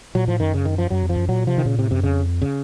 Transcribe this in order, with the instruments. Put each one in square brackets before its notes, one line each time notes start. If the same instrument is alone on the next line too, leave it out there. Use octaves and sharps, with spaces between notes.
[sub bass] A#2 [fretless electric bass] F#3
[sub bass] A2 [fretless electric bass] F3
[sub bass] F#2 [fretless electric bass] D#3
[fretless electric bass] C#3
D#3
F3
[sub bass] F#2 [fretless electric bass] F#3
[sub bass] F2
[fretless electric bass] F3
[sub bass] F#2
[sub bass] A#2 [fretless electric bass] F#3
[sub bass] C3 [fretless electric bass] F3
[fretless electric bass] D#3
[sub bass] A#2 [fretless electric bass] C#3
[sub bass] A2 [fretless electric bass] C3
[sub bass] F#2 [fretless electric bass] C3
[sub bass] F2 [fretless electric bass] C#3
[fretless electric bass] C#3